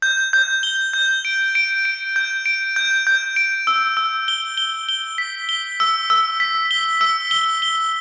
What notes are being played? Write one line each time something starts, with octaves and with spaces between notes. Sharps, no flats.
G6
G6
G7
G6
D7
D7
D7
G6
D7
G6
G6
D7
E6
E6
G7
G7
G7
B6
G7
E6
E6
B6
G7
E6
G7
G7